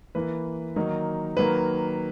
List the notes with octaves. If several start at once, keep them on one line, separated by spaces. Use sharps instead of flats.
E3 A#3 E4 B4
D#3 F#3 A#3 D#4
D#3 F#3 A#3 B4